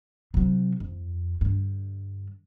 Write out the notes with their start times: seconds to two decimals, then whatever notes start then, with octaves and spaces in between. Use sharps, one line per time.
0.34 C3 F#3
0.80 F2
1.41 G2 D3